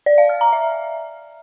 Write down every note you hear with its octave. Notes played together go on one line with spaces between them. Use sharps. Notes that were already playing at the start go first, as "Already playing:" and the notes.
D5
F5
F6
A#5
E5